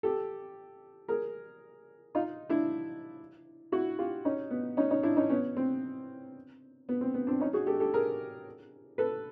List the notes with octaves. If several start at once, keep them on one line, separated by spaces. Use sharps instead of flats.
G4 A4
G#4 A#4
D#4 F4
D4 E4
E4 F#4
F4 G4
C#4 D#4
B3
C#4 D#4
C#4 D#4
D4 E4
C#4 D#4
B3 C#4
C4
B3
C4
B3
C4 D4
C#4 D#4
F#4 G#4
G4 A4
G4 A4
G#4 A#4
A4 B4